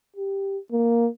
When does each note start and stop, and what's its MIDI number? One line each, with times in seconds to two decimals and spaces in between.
0.16 0.58 67
0.72 1.08 58